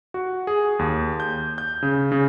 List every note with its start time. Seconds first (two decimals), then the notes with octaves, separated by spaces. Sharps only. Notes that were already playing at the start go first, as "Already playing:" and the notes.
0.14 F#4
0.47 G#4
0.79 D#2
1.20 G6
1.58 G6
1.82 C#3
2.12 C#3